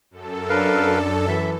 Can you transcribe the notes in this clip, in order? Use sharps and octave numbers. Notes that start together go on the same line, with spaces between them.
F#2 A4
D4 A#4 B4 F5
E3 E5